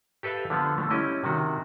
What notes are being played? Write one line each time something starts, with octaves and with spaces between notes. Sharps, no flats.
G4 A4 B4 E5 F5
D3 F3 B3
D3 A3
G3 C#4 E4 D#5
C3 D#3 F#4